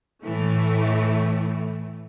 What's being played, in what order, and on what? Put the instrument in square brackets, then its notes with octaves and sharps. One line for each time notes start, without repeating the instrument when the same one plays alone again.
[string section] A2 E3 A3